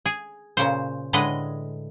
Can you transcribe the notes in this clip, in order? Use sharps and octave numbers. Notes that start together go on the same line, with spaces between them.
G#4
A#2 C#3 C5
A2 D3 G#3 B4 D#5